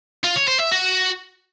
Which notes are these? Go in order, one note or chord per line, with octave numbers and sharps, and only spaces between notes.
F4
C#5
C5
E5
F#4